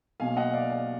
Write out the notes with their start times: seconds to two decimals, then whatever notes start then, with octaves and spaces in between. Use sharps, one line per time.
0.20 B1 B2 A#3 F5 G#5
0.36 D#5 F#5
0.53 D5 F5
0.70 D5 F5